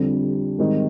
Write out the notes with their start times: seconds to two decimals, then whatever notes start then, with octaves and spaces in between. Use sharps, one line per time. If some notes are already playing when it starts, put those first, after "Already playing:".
Already playing: F2 D3 G3 C4
0.58 G#2 D#3 G3 C4 D#4